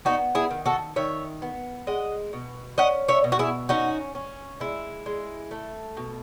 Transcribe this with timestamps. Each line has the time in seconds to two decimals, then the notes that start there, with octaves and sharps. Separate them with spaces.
0.05 B3 D#4 F#4
0.35 E4 G#4
0.51 D#3
0.66 F#4 A4
0.96 D#3 C#5 E5
1.42 B3
1.87 G#3 D#5 F#5
2.33 B2
2.78 C#4 D#5 F#5
3.08 C#5 E5
3.24 B2
3.32 F#4
3.39 E4 G#4
3.69 C#4 D#4 F#4
4.15 C#4
4.60 G#3 E4
5.06 G#3
5.51 A3
5.97 B2